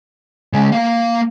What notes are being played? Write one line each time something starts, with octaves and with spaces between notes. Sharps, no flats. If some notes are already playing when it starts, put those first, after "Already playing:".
C#3 G#3
A#3 F5